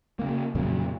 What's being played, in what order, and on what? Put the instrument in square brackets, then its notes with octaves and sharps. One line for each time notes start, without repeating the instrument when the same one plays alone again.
[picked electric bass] C#3 A#3
F2 A#2 C#3 F#3